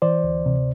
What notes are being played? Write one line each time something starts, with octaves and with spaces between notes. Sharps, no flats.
E3 C5 D5
D2
C3